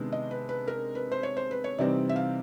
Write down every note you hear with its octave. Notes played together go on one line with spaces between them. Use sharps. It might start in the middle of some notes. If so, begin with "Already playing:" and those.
Already playing: C3 D#3 G#3 B3 D4
D#5
B4
B4
A#4
B4
C5
C#5
C5
B4
C#5
C3 E3 G3 C4 D#4 D5
E5
F5